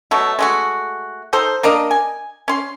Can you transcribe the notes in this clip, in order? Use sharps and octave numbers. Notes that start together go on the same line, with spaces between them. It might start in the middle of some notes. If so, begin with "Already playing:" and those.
B2 F#3 A3
G#3 A3 F#4
D#4 A4 C5
A#3 D4 A#4 D#5
G#5
C#4 C6